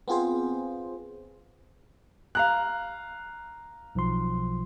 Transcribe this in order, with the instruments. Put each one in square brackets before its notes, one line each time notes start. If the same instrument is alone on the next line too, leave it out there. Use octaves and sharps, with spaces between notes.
[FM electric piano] B3 C4 F4 G#4 C5
[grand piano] F5 A#5 F#6
[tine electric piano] B1 F3 C6